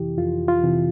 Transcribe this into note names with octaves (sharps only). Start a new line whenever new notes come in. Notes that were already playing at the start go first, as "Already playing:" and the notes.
Already playing: F2 C3 E3 E4 G4
F2 F4
F4
C3 E3